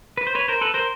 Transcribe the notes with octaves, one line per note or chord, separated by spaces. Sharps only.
B4
C5
B4 C#5
A#4 C5
A4 B4
A#4 C5